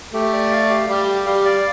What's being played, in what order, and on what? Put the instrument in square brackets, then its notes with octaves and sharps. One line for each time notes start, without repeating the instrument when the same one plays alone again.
[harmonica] A3 [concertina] G4
[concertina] D5
F5
G4
[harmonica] G3 [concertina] G4
[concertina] G4
[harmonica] G3 [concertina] F5
[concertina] D5